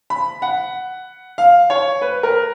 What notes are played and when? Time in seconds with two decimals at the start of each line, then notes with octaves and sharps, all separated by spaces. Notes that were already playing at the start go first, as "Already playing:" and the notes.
0.10 B5
0.42 F#5
1.38 F5
1.70 C#5
2.02 B4
2.23 A#4